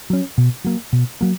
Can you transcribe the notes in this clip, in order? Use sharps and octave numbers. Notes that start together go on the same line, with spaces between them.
F#3 C#4
B2
F#3 A#3
B2
F#3 A#3